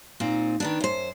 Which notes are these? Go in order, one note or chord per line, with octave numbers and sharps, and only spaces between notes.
A#2 C4 D#4
D#3 B3 D4
F#2 C5